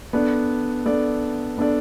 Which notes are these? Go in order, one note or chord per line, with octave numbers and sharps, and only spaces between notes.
B3 D4 A4 D5
B3 D4 A4 D5
B3 D4 A4 D5